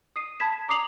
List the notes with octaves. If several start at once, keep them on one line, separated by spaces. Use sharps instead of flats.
D#6 C7 D#7
A5 B5 G#6 B6 E7
A#5 D6 D#6 C7 F7 F#7